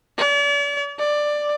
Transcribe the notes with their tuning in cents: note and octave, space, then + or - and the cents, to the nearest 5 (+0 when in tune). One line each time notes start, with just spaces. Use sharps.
D5 -45
D5 +10